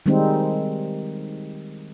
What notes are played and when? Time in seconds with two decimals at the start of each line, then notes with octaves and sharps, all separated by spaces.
0.06 D#3 G3 G#3 C4 D#4